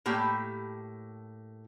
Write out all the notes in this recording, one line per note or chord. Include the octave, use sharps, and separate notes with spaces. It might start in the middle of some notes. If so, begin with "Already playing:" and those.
A2 A#3 G4 G5